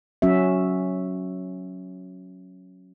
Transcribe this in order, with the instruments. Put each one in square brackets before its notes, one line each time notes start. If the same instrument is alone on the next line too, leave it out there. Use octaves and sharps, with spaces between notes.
[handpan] F#3 C#4 F#4 E5